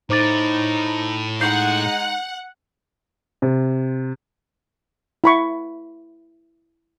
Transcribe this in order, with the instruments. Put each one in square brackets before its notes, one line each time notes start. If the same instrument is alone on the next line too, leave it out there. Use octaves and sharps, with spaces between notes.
[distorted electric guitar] A2 [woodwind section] D#4 [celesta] C5 D6 A6
[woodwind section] G#3 D#4 [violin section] F#5 [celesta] G6 C7
[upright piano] C3
[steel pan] E4 B5 C#6